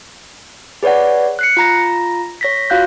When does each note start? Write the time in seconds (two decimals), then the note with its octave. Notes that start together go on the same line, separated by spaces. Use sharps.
0.83 G#4 B4 C#5 D5 F#5
1.39 F#6 C7 C#7
1.57 F4 A#5 A#6
2.41 C#5 A#6 B6
2.70 F4 F#4 F5 F#6 G6